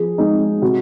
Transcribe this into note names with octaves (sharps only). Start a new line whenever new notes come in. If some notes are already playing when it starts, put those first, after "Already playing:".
Already playing: F3 G#4
G#3 D#4
C3 F#4